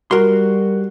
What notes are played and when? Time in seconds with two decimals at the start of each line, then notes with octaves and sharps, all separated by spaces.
0.11 G3 F#4 A#4 C6